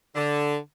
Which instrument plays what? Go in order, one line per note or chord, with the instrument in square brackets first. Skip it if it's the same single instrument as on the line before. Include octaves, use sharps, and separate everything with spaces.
[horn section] D3